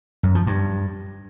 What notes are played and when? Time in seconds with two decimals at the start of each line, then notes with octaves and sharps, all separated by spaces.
0.23 F#2
0.35 F3
0.47 G2